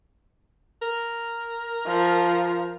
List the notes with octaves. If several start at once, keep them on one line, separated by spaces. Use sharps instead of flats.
A#4
F3